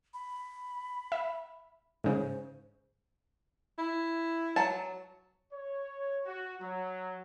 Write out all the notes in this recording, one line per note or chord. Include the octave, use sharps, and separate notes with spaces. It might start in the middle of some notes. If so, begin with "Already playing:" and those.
B5
E5
G#2 C#3 C5
E4
F#3 A5
C#5
F#4
F#3